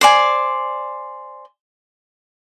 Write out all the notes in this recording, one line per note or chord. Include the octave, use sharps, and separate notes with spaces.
C5 D5 G#5